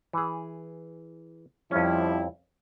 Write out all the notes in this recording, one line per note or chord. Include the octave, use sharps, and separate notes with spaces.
E3 G#4
F2 F3 G3 C#4 E4